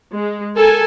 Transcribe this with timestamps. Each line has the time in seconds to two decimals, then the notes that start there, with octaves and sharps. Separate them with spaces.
0.14 G#3
0.56 A4 A#4 G#5